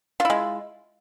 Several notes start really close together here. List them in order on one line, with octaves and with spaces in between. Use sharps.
F4 E4 G#3